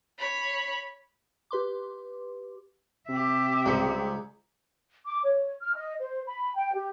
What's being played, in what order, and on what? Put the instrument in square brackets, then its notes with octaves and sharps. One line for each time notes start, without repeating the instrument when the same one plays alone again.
[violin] C#5 B5
[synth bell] G4 B4 C6 D6
[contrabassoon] C3 [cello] G4 E5
[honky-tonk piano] C#2 D#6 C#7 [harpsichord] G3 C5
[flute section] D6
C#5
F6
D#5
C5
B5
G5
G4